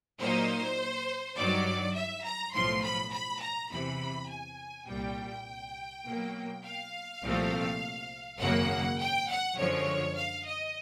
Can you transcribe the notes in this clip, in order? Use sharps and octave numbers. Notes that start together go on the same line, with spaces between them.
A#2 F#3 A#3 D#4 C5
G2 D#3 F#3 D5
E5
A#5
B1 A2 F3 C6
B5
B5
A#5
E2 C3 E3 B5
G#5
C2 A#2 G3 G5
B2 F#3 A#3
F5
C2 A#2 F3 A3 C4
G#1 F#2 C#3 F#3 A#3 F#5
G5
F#5
F#2 D3 F3 G#3 C#5
F5
D#5